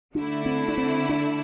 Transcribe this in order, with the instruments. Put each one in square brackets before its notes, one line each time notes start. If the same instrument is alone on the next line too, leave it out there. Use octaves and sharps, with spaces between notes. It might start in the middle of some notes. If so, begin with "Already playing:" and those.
[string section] D3 A3 E4 [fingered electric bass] D4
[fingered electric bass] C4
D4
C4
D4